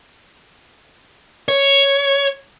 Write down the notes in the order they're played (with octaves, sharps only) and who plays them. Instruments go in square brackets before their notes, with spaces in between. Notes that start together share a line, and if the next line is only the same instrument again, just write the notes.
[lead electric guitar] C#5